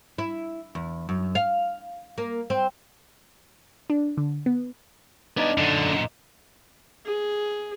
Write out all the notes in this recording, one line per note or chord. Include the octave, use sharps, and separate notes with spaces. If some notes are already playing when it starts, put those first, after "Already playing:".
E4
E2
F#2
F5
A#3
C4
D4
D3
B3
B3 D4 D#4 D5
F#2 A#2 D3 D4
G#4